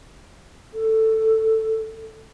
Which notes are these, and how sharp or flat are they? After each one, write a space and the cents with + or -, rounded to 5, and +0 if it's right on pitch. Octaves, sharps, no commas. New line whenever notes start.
A4 +10